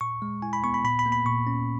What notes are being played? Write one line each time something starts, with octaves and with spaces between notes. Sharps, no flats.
A#2 C#6
G#3
E4 G#5
B5
B3 C#6
B5
A#2 B5
B5
A#3
B5
A#2 C#6
C#4